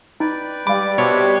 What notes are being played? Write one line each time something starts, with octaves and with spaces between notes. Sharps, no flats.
D#4 B4 D5 G5
G3 F5 B5 D6
B2 C4 D4 C#5 E5